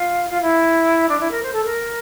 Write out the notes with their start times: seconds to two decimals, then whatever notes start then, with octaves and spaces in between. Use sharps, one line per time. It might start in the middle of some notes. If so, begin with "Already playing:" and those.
Already playing: F4
0.30 F4
0.41 E4
1.08 D4
1.19 E4
1.31 A#4
1.42 C5
1.53 A4
1.64 A#4